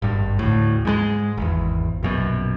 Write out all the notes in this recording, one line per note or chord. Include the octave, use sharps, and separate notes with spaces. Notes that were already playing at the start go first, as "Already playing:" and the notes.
G#1 G2
D2 A2
G#2 E3 G#3
G#1 E2
A#1 F#2 B2